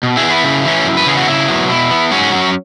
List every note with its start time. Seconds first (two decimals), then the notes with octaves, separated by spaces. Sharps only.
0.03 B2
0.17 E4 G#4
0.23 B3
0.30 E4
0.44 C#3
0.65 E3 C#4
0.86 F#2
0.97 B4
1.06 C#3 E3 B3 G#4
1.17 F#4
1.27 C#3 E4
1.48 F#3 B3
1.69 B2 E4
1.91 B3
2.11 G#2 C#4 F#4
2.32 F#3 C#4